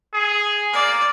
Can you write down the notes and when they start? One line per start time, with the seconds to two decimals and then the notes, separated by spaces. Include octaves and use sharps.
0.14 G#4
0.73 A#3 D5